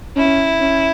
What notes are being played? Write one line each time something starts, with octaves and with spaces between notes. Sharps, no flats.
C#4 E4
C#4